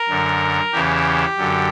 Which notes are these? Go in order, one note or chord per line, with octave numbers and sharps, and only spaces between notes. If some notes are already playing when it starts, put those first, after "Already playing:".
Already playing: A#4
F#2 D3
E2 C#3 E3 G4
F#2 D3